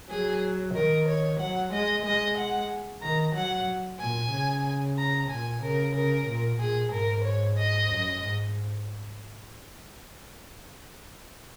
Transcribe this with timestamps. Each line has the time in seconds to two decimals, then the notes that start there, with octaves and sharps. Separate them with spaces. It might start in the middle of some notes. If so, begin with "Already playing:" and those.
0.10 F#3 G#4
0.75 D#3 A#4
1.08 C#5
1.40 F#3 F#5
1.73 G#3 D#5
2.05 G#3 D#5
2.37 F#5
3.02 D#3 A#5
3.35 F#3 F#5
4.00 A#2 G#5
4.32 C#3
4.98 A#5
5.30 A#2 G#5
5.62 C#3 A#4
5.94 C#3 A#4
6.27 A#2
6.59 A#2 G#4
6.92 G#2 A#4
7.24 C#5
7.57 D#5
7.90 F#2
8.22 G#2